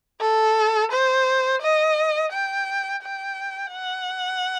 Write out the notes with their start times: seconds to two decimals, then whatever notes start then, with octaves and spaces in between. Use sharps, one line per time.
0.21 A4
0.92 C5
1.61 D#5
2.32 G5
3.03 G5
3.72 F#5